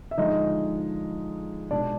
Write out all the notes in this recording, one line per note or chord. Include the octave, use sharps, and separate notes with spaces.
E5
D3 F3 G#3 D#4 D#5
B2 G#3 D4 D5